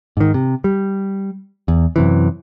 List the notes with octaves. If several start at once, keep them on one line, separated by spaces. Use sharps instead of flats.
G#2 D#3
C3
G3
E2
F#2 C3 E3